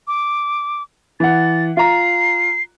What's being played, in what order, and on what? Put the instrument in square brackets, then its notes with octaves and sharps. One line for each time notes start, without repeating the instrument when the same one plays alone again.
[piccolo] D6
[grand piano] E3 F#5 [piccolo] A6
[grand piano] F4 A#5 [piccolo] C7